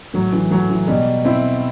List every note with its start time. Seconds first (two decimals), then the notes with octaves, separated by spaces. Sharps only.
0.14 A2 F#3
0.33 E3
0.51 A2 F#3
0.70 E3
0.87 B2 G3
1.25 B2 C4 E4